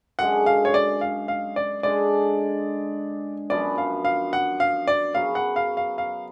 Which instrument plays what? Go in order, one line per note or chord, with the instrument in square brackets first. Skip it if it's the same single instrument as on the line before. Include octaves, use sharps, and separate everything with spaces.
[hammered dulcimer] F#2 D3 G#3 [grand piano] F#5
[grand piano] F5
C#5
D5
F5
F5
D5
[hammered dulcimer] D3 G#3 D4 G#4 [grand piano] D5
[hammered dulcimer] F#2 F3 B3 [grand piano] D5
[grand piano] F5
F5
F#5
F5
D5
[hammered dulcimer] F#2 C#3 F#3 B3 [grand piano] F5
[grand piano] F#5
F5
F5
F5